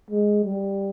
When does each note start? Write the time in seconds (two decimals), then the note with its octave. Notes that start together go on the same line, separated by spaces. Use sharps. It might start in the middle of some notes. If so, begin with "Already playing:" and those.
0.11 G#3
0.45 G3